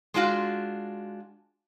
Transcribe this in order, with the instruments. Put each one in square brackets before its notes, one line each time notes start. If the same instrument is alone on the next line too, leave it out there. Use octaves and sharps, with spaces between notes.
[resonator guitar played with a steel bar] G#3 D4 F4 F#4